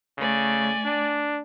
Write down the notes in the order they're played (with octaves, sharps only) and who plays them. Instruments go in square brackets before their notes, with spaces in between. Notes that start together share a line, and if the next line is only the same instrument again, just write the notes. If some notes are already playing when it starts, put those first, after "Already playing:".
[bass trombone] C#3 [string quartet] A3 D5 G#5
[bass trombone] D4